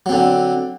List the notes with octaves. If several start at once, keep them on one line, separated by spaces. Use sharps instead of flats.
D3 F#3 C4